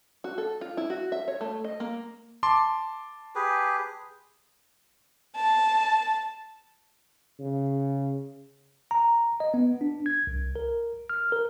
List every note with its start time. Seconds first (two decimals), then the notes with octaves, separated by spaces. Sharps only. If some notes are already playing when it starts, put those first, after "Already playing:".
0.24 F#4
0.38 A4
0.61 F4
0.77 E4
0.90 F#4
1.12 E5
1.28 C#5
1.41 A3
1.64 D#5
1.80 A#3
2.43 A5 C6 D6
3.35 G4 G#4 B4
5.36 A5
7.40 C#3
8.91 A#5
9.40 D#5
9.54 B3
9.81 D4
10.06 G#6
10.27 C2
10.56 A#4
11.10 F6
11.32 A#4